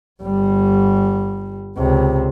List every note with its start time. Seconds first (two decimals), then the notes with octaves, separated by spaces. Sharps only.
0.23 G1 G3
1.77 C#2 C3